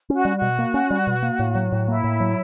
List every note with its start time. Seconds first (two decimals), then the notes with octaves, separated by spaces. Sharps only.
0.10 C#4 F#4
0.25 G3
0.37 B2 F#4
0.59 A#3
0.74 C#4
0.90 G3
1.07 B2
1.23 A#3
1.39 A2
1.55 F#3
1.72 A2
1.88 A#3 E4
2.04 A2
2.20 F#3